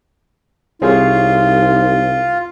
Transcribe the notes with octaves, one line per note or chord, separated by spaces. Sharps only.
C2 C4 D#4 F4 G#4 C#5